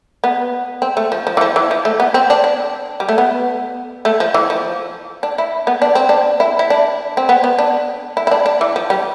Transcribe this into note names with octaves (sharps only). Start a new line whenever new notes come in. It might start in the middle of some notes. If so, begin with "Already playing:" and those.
B3
C4
A3
F3
F3
E3
F3
E3
F3
A3
B3
C4
D4
D4
G3
A3
B3
A3
F3
E3
F3
D4
E4
B3
D4
C4
D4
E4
E4
D4
C4
B3
B3
D4
E4
E4
D4
D4
E3
F3
G3